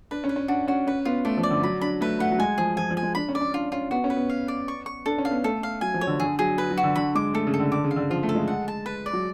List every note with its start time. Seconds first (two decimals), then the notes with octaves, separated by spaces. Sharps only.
0.11 D4 B4
0.24 C#4
0.29 B4
0.36 C#4
0.48 D4 F#4
0.68 C#4 F#4
0.87 C#4 B4
1.05 B3 F4
1.25 A3 D5
1.37 F3
1.43 D5
1.51 D3
1.63 F#3 B5
1.81 D4 B5
2.01 A3 B4
2.20 A3 F#5
2.31 F#3
2.39 G#3 G#5
2.58 F3 G#4
2.77 F3 G#5
2.90 F3
2.97 G#5
3.03 G#3
3.15 D4 B5
3.29 C#4
3.35 D5
3.41 C#4
3.54 D4 F4
3.72 C#4 F4
3.91 B3 F#4
4.04 C#4
4.10 B4
4.16 B3
4.30 F5
4.48 D5
4.68 C#6
4.86 C#6
5.06 D4 A4
5.18 C#4
5.25 F5
5.31 B3
5.44 A3 A4
5.63 F5
5.81 F#3 G#5
5.94 F3
6.01 C#5
6.07 D3
6.20 D3 G#4
6.39 F#3 G#4
6.58 B4
6.71 F#3
6.77 F#4
6.83 D3
6.95 D3 B5
7.15 G#3 D6
7.34 A3 A4
7.47 C#3
7.54 A4
7.60 D3
7.72 D3 D6
7.84 C#3
7.91 F5
7.96 D3
8.10 F3 F4
8.23 A3
8.29 A4
8.35 G#3
8.48 F#5
8.68 A5
8.86 B4
9.06 D5
9.13 F#3